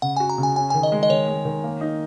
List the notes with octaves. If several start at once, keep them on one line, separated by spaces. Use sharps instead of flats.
C#3 F#5
F#4 G#5
A#5
C#3
G#5
C#4 G#5
D#3 G#5
D#5
G#3
D#5
D#3 C#5
G#3
D#3
A#3
D#4